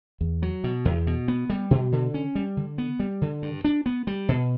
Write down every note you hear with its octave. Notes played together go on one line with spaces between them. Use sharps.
E2
F#3
B2
E2
B2
B3
G3
B2
D3
C#4
G3
D3
B3
G3
D3
G2
D4
B3
G3
B2